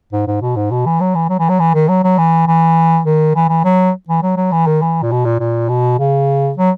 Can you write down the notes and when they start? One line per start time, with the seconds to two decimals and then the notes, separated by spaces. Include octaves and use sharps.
0.12 G#2
0.27 G#2
0.41 B2
0.56 G#2
0.71 B2
0.86 E3
1.00 F#3
1.15 E3
1.29 F#3
1.39 E3
1.49 F#3
1.59 E3
1.74 D#3
1.88 F#3
2.04 F#3
2.18 E3
2.48 E3
3.05 D#3
3.35 E3
3.49 E3
3.64 F#3
4.09 E3
4.23 F#3
4.37 F#3
4.52 E3
4.67 D#3
4.82 E3
5.02 A#2
5.11 B2
5.25 A#2
5.40 A#2
5.69 B2
5.99 C#3
6.57 F#3